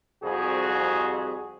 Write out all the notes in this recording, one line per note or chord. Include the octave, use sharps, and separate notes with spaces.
C2 F2 F#4 G#4